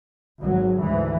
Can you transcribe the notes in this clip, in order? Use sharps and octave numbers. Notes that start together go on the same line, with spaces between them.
G#1 F#3
D2 G#2 E3